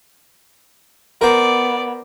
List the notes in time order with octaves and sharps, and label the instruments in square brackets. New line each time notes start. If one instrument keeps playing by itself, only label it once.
[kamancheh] B3 [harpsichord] A#4 C5 [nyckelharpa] D5